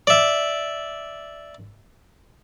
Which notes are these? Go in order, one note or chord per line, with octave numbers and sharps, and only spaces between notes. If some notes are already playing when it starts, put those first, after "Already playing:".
D5 E5